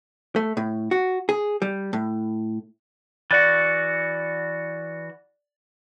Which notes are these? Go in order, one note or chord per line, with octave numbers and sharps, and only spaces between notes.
A3
A2
F#4
G#4
G3
A2
E3 F#4 D5 F#6 A6